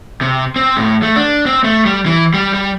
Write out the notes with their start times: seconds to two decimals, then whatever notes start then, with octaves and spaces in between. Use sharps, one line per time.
0.21 C3
0.56 C4
0.77 A2
1.03 A3
1.16 D4
1.46 C4
1.64 A3
1.85 G3
2.06 E3
2.34 G3
2.54 G3